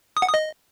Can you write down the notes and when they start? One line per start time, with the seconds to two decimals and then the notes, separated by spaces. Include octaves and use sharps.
0.17 D#6
0.22 F#5
0.28 D#6
0.34 D#5